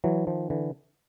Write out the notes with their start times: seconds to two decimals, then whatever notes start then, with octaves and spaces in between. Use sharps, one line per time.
0.04 E3 F#3
0.27 D#3 F3
0.50 D3 E3